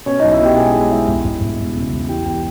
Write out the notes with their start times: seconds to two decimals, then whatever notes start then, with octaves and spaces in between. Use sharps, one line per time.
0.06 B2 C#4 C#5
0.19 B1 D#4 D#5
0.32 E4 E5
0.40 B2 G4 G5
0.57 G#3 G#4 G#5
0.74 G#3
0.90 G#3 E4 E5
1.07 E1
1.25 E1
1.41 E1
1.59 E1
1.76 C#3
1.92 E1
2.08 E3 G4 G5
2.26 E2 G4 G5